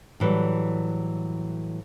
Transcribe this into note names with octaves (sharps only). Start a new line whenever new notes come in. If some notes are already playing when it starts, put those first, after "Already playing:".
A2 E3 F#3 G3